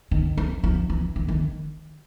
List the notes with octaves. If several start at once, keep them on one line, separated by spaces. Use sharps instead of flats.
D#3
F3
F3
E3
E3
D#3